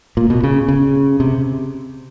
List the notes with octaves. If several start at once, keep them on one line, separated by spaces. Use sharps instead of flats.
A#2
B2
C#3
C#3
C3